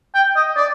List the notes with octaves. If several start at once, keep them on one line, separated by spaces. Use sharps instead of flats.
G5
D#5
D5